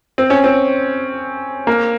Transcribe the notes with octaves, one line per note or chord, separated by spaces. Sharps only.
C4
C#4
C4
A#3